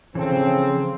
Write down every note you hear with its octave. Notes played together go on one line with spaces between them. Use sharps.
C#3 E3 F3 C4 A4